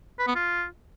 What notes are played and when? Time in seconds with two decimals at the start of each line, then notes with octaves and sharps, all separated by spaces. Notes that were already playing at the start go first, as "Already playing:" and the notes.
0.19 B4
0.27 B3
0.35 F4